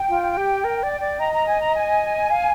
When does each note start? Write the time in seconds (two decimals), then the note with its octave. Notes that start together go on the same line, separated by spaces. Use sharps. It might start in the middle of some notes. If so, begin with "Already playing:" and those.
Already playing: G5
0.09 F4
0.37 G4
0.64 A#4
0.83 D5
1.01 D5
1.19 D#5 A#5
1.34 A#5
1.47 G#5
1.61 A#5
1.75 G#5
2.30 F5